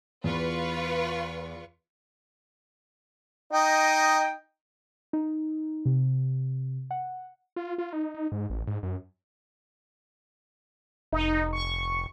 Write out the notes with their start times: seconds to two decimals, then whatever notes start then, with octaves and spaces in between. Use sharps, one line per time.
0.24 E2 F4 B4 C#6
3.53 D#4 D#5 G5
5.13 D#4
5.86 C3
6.91 F#5
7.56 F4
7.78 F4
7.93 D#4
8.14 D#4
8.32 G#2
8.50 A1
8.67 G#2
8.83 F#2
11.12 F1 D#4
11.53 C#6